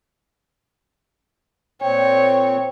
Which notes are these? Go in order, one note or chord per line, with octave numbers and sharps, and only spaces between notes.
A#2 C4 C#5 G5